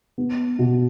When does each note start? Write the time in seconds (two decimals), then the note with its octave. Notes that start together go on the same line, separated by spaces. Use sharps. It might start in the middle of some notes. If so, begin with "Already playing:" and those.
0.18 B3
0.59 B2